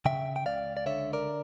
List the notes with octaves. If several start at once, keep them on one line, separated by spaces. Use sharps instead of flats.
C#3 E5 G5
G5
C#2 D5 F5
D5
D3 C#5 E5
A#4 D5